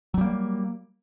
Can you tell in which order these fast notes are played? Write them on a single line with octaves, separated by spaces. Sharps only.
F#3 G3 A#3